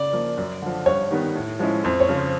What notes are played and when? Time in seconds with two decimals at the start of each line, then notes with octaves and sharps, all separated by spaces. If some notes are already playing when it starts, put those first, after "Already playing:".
Already playing: C#3 D5
0.13 F3 A#3
0.37 F#2
0.62 D3 F3
0.86 G2 C#5
1.11 D#3 G3 B3
1.35 A2
1.59 F3 G#3 C#4 E4
1.84 F2 C5
2.00 C#5
2.09 C#3 F3
2.17 C5